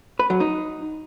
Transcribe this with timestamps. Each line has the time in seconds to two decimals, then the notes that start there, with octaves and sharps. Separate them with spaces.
0.19 B4
0.30 F#3
0.40 D#4